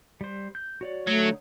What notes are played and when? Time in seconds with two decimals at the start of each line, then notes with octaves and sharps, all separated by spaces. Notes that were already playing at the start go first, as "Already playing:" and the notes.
0.21 G3 C5
0.55 G6
0.81 F#4 C#5 D5
1.07 D3 F#3 A3 D#4 C#5